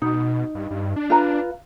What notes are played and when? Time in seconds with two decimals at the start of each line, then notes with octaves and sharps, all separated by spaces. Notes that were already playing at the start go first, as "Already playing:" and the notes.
0.02 B2 D#4
0.55 G2
0.71 G2
0.96 D4
1.10 F4 B4 A#5